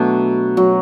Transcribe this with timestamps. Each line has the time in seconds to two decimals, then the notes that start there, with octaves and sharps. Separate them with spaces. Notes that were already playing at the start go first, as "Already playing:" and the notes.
Already playing: B2 F#3 A3 D4
0.57 F#3